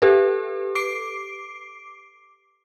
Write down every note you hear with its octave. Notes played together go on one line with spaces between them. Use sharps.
G4 A4 B4
D6 C7 D7